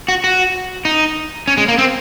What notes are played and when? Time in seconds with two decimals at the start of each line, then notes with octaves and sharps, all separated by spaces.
0.08 F#4
0.24 F#4
0.85 D#4
1.48 C#4
1.57 G#3
1.68 A#3
1.78 C4